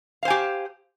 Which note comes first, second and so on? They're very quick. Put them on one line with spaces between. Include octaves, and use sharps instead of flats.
F5 C5 G#5 G4